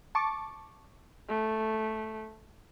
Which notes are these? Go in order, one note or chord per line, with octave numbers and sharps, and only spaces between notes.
A5 C#6 D6
A3